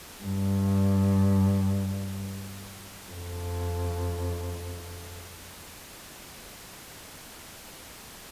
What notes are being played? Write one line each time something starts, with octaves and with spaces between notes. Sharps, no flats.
G2
F2